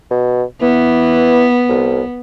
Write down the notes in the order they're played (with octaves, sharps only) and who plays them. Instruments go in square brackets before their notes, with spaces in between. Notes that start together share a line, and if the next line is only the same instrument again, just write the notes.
[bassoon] B2
[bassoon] E3 [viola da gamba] B3
[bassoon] C2